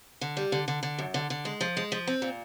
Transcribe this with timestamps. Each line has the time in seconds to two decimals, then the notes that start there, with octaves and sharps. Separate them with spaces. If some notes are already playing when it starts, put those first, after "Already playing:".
0.21 D3
0.37 G3
0.52 D3
0.68 D3
0.83 D3
0.99 F#2
1.14 D3
1.30 D3
1.45 G#3
1.61 F3
1.77 G#3
1.92 F3
2.07 C4
2.22 A#2